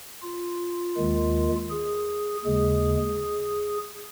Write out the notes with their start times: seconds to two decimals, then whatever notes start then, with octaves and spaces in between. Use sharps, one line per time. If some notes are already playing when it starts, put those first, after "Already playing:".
0.22 F4
0.97 D#2 D#3 G#3
1.70 G#4
2.45 D#2 C#3 G#3 G#4